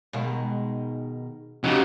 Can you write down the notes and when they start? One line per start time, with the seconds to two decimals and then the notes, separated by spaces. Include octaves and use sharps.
0.13 B2 D#3 G#3
1.64 C#3 F#3 D#4 G4